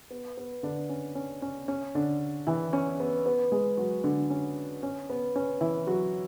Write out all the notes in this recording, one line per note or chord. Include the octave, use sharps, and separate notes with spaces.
B3
B3
D3 D4
C#4
C#4
C#4
C#4
D3 D4
E3 E4
C#4
B3
B3
G#3 G#4
F#3 F#4
D3 D4
C#4
C#4
B3
C#4
E3 E4
F#3 F#4